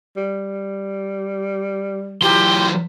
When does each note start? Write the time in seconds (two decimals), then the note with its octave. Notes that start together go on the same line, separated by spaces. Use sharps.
0.17 G3
2.22 E3 F#3 G4 C6